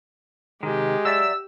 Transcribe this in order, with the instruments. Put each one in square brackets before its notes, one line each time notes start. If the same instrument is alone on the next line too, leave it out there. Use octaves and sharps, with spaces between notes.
[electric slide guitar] C3 D#3 [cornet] G#3 [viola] G4
[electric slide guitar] F#3 D5 E5 [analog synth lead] E6